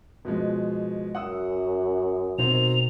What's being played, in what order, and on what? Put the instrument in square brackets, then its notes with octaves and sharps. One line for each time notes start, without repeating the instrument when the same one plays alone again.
[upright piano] B2 F3 G#3
[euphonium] F#2 [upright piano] F#5 D#6 E6
[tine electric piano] B2 [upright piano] D#3 F#3 C4 [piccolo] F7